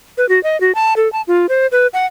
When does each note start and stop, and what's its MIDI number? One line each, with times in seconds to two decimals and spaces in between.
0.18 0.28 71
0.29 0.41 66
0.43 0.59 75
0.61 0.74 66
0.75 0.94 81
0.96 1.11 69
1.13 1.22 81
1.27 1.46 65
1.49 1.67 72
1.72 1.87 71
1.94 2.06 78